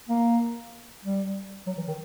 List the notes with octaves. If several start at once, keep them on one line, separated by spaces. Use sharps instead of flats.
A#3
G3
F#3
E3
D#3